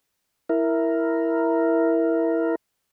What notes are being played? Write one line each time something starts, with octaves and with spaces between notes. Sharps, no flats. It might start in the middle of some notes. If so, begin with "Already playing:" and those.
E4 A#4